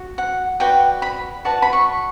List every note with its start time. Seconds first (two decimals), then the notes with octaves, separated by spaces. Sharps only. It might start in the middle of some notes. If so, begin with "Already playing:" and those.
Already playing: F#4
0.18 F#5
0.60 F#4 B4 D5 G5
1.02 B5
1.45 F#4 B4 D5 A5
1.62 B5
1.73 C#6